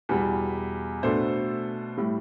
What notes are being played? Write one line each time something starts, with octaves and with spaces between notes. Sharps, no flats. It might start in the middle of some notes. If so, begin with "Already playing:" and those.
E2 B2 G3
B2 A3 D4 A4 C5
A2 G3